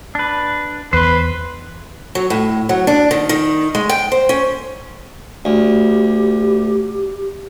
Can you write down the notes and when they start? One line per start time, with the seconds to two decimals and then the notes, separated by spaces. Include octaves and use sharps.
0.15 D4 B4
0.93 E2 B4 C5 C6
2.15 F#3
2.30 A2
2.69 F#3
2.87 D4
3.11 D#3
3.29 D#3
3.75 G#3
3.89 G5
4.12 C5
4.29 C#4
5.45 D2 G4